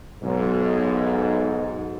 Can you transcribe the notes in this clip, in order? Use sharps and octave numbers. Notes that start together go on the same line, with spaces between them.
B1 G#2